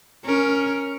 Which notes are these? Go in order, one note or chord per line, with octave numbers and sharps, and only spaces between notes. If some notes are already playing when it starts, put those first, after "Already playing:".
C#4 A#4